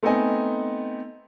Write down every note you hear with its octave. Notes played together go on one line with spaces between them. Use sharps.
A3 B3 C4 D#4 D#5 G#5